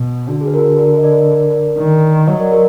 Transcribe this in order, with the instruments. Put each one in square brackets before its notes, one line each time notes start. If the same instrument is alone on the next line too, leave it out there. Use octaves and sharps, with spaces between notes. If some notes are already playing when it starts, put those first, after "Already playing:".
Already playing: [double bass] B2
[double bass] D3 [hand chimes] F#4
[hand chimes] G#4
B4
F#4 A#4
A#4 D5
D#5
A#4 D5
[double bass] D#3
[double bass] F#3 [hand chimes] B4 D#5
[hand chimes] A#4 D5
F#4 A#4